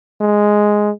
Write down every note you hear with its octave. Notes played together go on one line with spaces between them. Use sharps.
G#3